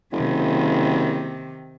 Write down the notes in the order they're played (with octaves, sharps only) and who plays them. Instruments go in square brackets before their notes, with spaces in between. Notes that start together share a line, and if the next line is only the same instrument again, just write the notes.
[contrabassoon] F#1 [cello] C3 D#3